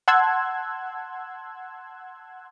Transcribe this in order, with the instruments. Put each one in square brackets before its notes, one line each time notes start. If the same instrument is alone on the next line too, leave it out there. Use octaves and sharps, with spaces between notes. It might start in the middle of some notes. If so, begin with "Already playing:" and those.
[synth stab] F#5 A5 C6 E6 F#6 G#6